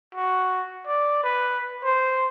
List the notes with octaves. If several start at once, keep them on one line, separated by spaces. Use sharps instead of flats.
F#4
D5
B4
C5